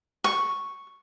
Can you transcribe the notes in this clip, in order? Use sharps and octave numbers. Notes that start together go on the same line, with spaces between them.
C#6